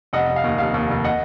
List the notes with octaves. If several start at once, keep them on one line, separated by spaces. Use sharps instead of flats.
F1 D#5 F#5
F1
F5
D#2
F1 F5
D#2
F1
D#5 F#5